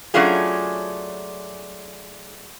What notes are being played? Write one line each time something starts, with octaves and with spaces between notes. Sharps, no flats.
F#3 A3 C#4 D4 F4 G#4